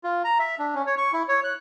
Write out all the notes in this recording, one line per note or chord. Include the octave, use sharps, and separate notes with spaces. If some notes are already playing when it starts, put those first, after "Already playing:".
F4
A#5
E5
D4
C#4
C#5
C#6
E4
C#5
F#6